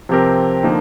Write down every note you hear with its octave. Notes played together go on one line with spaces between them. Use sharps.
C3 F3 C4 G4 A#4
D3 F3 A#3 D#4